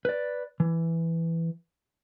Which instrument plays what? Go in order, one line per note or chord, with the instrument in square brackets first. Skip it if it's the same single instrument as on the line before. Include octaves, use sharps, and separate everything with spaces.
[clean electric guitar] B4 D5
E3